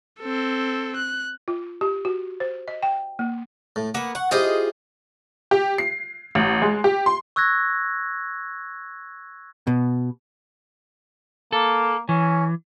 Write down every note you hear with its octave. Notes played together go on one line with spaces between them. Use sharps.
C4 A4
F#6
F4
G4
F#4
C5
D#5
G5
A#3
A2
A#3 B3 F#5
F#5 C#6
E4 F4 G4 G#4 C5 D#5
G4
C7
A1
G#3
G4
C6
C#6 E6 F#6 G#6 A#6
B2
A#3 A4
E3 C#4